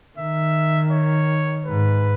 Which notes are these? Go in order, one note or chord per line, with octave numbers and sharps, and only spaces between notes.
D#3 E5
C#5
G#2 B4